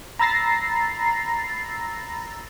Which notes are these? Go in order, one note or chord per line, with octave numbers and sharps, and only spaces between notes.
A#5 B5 E6 A6 A#6 C7